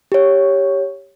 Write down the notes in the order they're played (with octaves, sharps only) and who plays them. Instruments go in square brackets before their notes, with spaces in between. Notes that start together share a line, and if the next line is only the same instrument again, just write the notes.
[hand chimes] G4 C#5